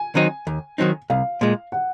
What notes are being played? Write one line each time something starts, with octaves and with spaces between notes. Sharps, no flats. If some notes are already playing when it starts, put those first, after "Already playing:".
Already playing: G#5
D#3 F#3 C4 D#4
D#2
D#3 F#3 C4 D#4
C2 F5
A#2 G#3
F#5